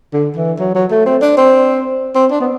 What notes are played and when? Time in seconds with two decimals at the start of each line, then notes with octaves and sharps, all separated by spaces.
0.13 D3
0.36 E3
0.60 F#3
0.75 F#3
0.91 A3
1.06 C4
1.22 D4
1.37 C4
2.15 C4
2.31 D4
2.40 B3